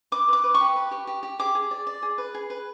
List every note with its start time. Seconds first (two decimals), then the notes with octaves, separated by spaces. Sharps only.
0.12 B4 D6
0.28 B4 D6
0.44 B4
0.54 C#6
0.60 G4
0.76 B4
0.91 G4
1.07 G4
1.23 G4
1.39 G#4 D6
1.55 G#4
1.71 D5
1.87 D5
2.03 G#4
2.18 B4
2.34 G#4
2.50 B4